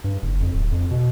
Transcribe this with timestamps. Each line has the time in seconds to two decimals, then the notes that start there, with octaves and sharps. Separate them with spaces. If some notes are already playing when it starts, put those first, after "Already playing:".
0.04 G2
0.22 F#1
0.41 F2
0.54 D1
0.72 F2
0.91 B2